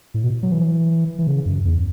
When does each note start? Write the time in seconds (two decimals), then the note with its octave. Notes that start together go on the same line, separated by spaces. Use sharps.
0.14 A2
0.24 B2
0.43 F#3
0.52 E3
1.19 E3
1.27 C#3
1.46 F#2
1.64 E2